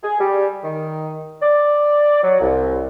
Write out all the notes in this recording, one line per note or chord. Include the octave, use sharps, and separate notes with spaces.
G#4
G3
D#3
D5
F#3
C2